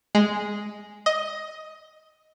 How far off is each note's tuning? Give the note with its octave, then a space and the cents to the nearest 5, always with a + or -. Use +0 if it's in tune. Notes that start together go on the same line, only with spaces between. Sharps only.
G#3 +0
D#5 +10